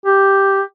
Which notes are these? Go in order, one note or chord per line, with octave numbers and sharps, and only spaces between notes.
G4